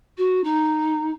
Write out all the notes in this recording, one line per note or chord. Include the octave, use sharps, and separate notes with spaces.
F#4
D#4